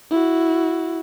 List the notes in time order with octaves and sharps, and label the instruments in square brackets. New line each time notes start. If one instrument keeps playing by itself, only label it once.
[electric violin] E4 F#4